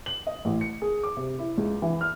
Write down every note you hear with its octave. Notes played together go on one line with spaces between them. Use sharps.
F#7
D#5
A1
C#7
G#4
D6
C3
E4
C#2
E3
F6